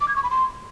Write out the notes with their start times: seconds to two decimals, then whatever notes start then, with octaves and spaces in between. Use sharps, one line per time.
0.01 D6
0.08 G#6
0.16 C#6
0.23 B5
0.31 C6